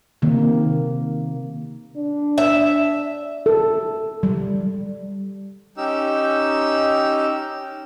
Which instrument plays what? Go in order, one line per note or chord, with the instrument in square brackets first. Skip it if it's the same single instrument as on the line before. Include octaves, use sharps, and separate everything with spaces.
[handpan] C3 D#3 A#3
[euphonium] D4
[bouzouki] E5
[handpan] A4
G3
[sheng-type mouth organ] C#4 D#4 G4 E6